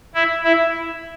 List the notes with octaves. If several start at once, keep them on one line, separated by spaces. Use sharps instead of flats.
E4
E4